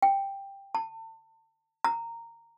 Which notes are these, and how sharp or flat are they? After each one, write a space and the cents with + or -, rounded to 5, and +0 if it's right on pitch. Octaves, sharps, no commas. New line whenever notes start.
G5 +5
A5 +35
A#5 -15